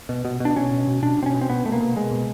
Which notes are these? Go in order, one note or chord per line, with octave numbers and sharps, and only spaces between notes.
B2
B2
B2 D4
B2 C#4
B2
B2
B2 D4
B2 C4
C#4
B2
C4
B2 B3
B2 A3
A#3
B2
B2 G#3
B2